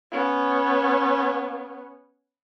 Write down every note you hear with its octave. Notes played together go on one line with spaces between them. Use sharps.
B3 C#4